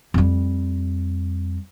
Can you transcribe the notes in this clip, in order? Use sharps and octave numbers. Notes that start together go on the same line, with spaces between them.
F2 G3